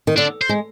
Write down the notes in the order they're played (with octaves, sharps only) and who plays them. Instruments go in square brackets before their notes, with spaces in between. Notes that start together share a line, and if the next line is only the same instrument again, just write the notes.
[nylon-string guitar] D#3
[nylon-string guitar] D3 [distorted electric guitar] D4
[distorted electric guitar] C5
[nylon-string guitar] G#3